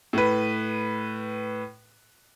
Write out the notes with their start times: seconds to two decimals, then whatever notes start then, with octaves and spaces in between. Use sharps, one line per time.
0.13 A2 B4